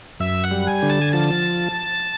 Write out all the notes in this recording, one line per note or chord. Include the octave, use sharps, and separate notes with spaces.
F#2 E5
F#5
G3
G#5
D3
A5
G#5
F3 A5